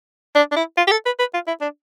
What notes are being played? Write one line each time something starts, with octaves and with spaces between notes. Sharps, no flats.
D4
D4
E4
F4
G4
A4
B4
B4
F4
E4
D4